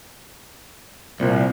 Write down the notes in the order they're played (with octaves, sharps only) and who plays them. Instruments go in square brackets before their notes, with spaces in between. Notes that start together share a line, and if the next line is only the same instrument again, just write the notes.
[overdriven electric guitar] C2 [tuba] A#2